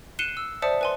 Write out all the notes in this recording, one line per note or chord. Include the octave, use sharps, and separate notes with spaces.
F#6 C7 C#7 D#7 E7 G7
E6
C5 D5 E5 A5 D#6 C#7
B4 G#5 C6